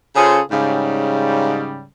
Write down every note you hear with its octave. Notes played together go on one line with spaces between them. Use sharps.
C#3 C#4 F4 G#4 A4 C5
G#2 C#3 G3